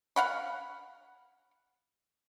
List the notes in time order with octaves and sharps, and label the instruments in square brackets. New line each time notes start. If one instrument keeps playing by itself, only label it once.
[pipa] F5 F#5 B5